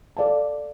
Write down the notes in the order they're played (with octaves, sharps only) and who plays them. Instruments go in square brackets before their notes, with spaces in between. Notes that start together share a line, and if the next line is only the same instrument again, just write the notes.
[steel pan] A4 D5 F5 A5